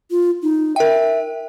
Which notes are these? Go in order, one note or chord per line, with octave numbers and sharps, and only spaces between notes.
F4
D#4
A#4 E5 G5